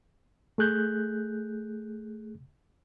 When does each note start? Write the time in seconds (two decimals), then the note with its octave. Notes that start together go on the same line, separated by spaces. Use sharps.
0.58 A3 G#4 F#6 G6